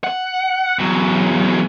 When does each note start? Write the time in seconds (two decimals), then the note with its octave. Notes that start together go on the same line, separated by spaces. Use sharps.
0.04 F#5
0.79 E2 F#3